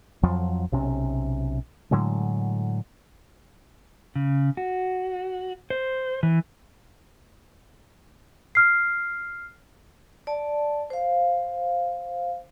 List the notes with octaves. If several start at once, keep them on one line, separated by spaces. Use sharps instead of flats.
F2 F3 F#3
B1 C3 C#4
A2 D3 F#3 G#3
C#3
F#4
C5
E3
F6 C7
D5 A5
C5 F5